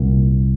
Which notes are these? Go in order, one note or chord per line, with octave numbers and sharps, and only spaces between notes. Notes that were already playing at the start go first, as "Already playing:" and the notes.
Already playing: C2 A#2